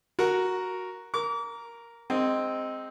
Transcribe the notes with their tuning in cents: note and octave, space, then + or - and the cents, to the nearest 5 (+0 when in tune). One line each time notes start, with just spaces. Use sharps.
F#4 +0 A#4 +0
A#4 +0 D6 -35
G#3 -10 C4 +0 D#4 +0